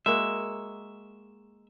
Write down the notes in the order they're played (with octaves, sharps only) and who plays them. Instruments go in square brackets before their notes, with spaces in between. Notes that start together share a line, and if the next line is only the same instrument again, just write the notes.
[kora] G#3 A#3 F#4 [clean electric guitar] E5